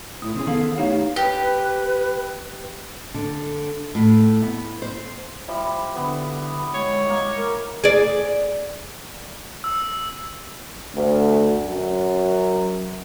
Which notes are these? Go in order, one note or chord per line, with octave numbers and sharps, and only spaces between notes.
A2 E4 D#6
C3 C4 C#4 G#4
D#3 B3 E4 A4 F5
A2 D#4 E4 G4 C#5 F5
G4 B4
D3
A2
B3
C5
F3 G3 E4
D3 B3
G#3 C#5
G#3 A#3
A#4
G#4 D5
E6
D2
F#2